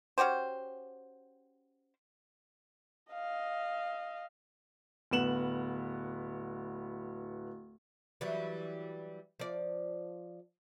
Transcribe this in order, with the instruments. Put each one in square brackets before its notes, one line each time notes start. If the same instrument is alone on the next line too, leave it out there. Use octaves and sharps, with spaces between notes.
[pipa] C#4 F#4 G4 C5
[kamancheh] D#5 F5
[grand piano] D1 B3 E7 F#7
[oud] E3 F#3 G3
F3 D5